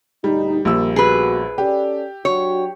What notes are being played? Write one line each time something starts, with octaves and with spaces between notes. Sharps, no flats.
D2 A#2 G3 D#4
A#1 G3 A#3 E6
A#3 B3 F#4 G#4 B4
C#4 G4 A4 D5
F#3 D4 F#4 C#5